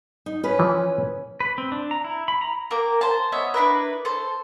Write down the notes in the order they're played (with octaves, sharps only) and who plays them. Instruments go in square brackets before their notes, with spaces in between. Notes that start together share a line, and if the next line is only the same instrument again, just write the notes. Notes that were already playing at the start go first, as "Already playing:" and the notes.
[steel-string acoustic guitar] D#4
C#4 B4
[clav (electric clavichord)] E3 F3
[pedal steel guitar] B4
C4
D4
A#5
E4
B5
A#5
[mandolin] A#3 A#4 G5 D6
C5 A5
B3 C#4 D#5 E5
D4 E4 A#4 B4
A4 C5